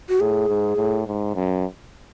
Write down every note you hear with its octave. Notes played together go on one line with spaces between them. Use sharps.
F#4
A2 G#4
G#2
A2
G#2
F#2